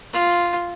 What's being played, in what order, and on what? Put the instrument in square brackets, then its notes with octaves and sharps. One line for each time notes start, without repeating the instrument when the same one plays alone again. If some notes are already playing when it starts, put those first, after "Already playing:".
[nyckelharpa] F4